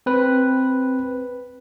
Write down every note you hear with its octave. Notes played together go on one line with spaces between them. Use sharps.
C4 B4